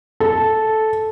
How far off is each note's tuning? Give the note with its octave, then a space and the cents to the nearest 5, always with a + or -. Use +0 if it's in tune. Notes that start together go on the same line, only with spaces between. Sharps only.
A4 -10